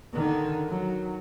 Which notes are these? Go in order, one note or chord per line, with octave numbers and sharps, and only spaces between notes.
D3 D#3
D#3 F#3